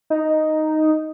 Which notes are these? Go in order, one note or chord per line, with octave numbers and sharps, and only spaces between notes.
D#4